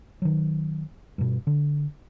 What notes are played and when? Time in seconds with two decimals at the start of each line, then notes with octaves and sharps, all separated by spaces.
0.22 D#3 F#3
1.18 G2 B2
1.47 D3